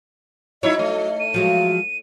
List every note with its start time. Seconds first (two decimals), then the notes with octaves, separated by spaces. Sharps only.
0.63 F#3 D#4 E4 C#5 D#5
0.79 A3
1.20 D#7
1.34 F3 F#3 G#3 F#4